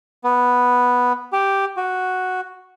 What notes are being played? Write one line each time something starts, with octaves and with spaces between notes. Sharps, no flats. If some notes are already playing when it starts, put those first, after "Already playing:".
B3
G4
F#4